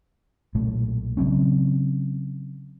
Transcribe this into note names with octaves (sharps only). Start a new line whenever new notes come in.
B1 A#2 A3
C#3 F#3 C4 C#4